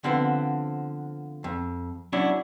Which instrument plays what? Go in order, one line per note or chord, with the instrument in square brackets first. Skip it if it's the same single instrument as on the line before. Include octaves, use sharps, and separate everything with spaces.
[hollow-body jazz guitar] D3 F3 B3 C4
F2
F#3 C#4 D4 E4